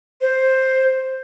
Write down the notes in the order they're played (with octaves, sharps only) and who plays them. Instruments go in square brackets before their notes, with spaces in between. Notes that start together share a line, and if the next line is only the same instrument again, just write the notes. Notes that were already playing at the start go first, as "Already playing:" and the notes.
[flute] C5